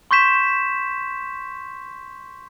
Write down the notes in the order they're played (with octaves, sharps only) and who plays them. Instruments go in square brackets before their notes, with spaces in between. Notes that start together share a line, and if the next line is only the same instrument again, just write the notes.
[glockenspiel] C6 C#6 G6 B6 E7